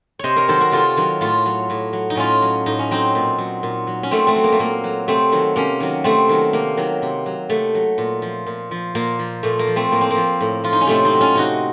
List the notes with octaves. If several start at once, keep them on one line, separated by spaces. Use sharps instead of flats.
C3 C5 C#5 D#5
A#4 C#5
D#3 F#3 A4 C5
F#4 A#4
C3 F4 A4
D#3 F#3
A2 F4 A4
F#3
A2
F#3
D#4
A2 C#4 F4
F#3
A2 D#4
C#4
F#3 C4 D#4
A#2
F#3
A#2
F#3
C#4
A#2 A3 C4
A3 C4
F#3
A#3
A3
A#2 A#3
F#3
C3 A3 C4
D#3 F#3
C3 A#3 C#4
D#3 F#3
C3 A3 C4
D#3 F#3
C3 A#3
D#3 F#3
C3
F#3
C3 A3
F#3
A#2
F3
A#2
F3
A#2 A#3
F3
A#2 A3
A#3
F3
A3 C4
A2 A#3
C4
A#3
F3
A2
F3 F4
D#4
C#4
C3 A3 C4
C4 D#4
F#3
C#4 F4
C3 D#4 F#4